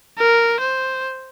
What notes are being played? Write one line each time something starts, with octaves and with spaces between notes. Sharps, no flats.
A#4
C5